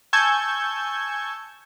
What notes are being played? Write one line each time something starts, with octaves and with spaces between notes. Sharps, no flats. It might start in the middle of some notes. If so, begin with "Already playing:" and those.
G#5 A5 C#6 E6 G6 G#6